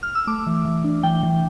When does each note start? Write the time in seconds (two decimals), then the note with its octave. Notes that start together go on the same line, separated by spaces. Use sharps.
0.03 F6
0.15 E6
0.27 A3 D6
0.47 E3
0.65 E3
0.84 D4
1.03 E3 G5
1.23 E3